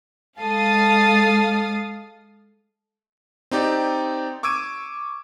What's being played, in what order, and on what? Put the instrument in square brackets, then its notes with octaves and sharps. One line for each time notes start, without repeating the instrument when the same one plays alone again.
[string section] G#3 A4 F5 D#6 A6 C7
[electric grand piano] C4 D#4 G4 D5
C#6 D6 E6 G#6 D7 D#7